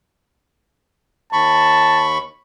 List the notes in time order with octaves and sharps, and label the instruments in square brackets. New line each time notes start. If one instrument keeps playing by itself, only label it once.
[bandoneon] D#2 B5 C#6 [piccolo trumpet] A5